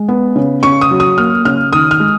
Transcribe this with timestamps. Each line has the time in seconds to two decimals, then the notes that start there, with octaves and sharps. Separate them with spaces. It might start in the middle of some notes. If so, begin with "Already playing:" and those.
Already playing: G#3
0.08 B3
0.36 C#3
0.63 C#3 C#6
0.81 D#6
0.91 F#3
1.00 D#6
1.18 A#3 F6
1.45 C#3 F6
1.73 D#3 D#6
1.91 F6
2.00 G#3